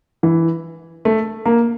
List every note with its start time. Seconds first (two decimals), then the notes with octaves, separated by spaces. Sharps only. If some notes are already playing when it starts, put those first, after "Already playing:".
0.23 E3
1.05 A3
1.45 A#3